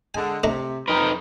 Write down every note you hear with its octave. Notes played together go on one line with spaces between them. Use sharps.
D3 G#3 G#5
C3 A3 D4 A#5
F2 D#4 A#4 B4